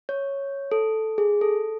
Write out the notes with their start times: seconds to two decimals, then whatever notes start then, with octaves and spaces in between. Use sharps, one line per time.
0.09 C#5
0.72 A4
1.18 G#4
1.41 A4